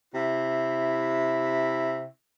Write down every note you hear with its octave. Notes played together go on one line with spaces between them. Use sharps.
C3 E4 E5